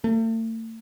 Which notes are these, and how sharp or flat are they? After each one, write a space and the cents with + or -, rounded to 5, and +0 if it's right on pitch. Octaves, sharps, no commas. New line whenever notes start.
A3 +40